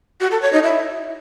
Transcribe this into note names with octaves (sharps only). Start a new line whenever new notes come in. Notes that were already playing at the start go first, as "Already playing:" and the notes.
F#4
A4
C#5
D#4
E4